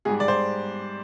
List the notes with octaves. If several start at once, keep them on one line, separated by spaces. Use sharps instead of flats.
G#2 G3 G#4
D5
C5